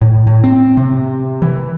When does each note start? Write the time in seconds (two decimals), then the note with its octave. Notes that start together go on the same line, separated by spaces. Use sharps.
0.02 A2
0.27 A2
0.44 C4
0.77 C3
1.42 E3